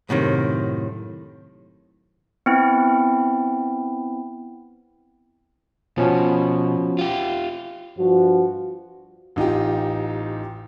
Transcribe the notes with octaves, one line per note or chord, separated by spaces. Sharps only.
F#2 A2 C3 D#3
B3 C4 E4
B2 F3 C#4 F#4
F4 G4
G2 F3 F#4
A1 D#4 F4 G4